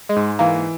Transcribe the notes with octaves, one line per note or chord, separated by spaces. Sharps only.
G#3
G#2
E3 A#3